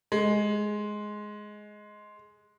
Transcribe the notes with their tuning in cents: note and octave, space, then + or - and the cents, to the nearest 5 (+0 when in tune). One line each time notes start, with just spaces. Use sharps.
G#3 +10